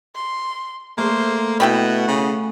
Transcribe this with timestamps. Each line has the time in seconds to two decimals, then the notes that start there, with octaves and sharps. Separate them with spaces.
0.15 C6
0.98 A3 A#3 C5
1.60 B2 E4 F#5 G5 B5
2.08 C#3